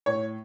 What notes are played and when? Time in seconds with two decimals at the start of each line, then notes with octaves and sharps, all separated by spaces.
0.06 A2 C#5